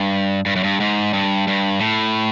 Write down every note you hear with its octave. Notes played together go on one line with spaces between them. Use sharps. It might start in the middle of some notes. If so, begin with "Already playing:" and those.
Already playing: G2
G2
F#2
G2
G#2
G2
G2
A2